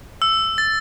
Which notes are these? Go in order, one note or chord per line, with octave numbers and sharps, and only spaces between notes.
E6
A6